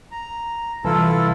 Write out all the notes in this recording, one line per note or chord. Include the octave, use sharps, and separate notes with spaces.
A#5
C2 E3 E4 F4 A4 A5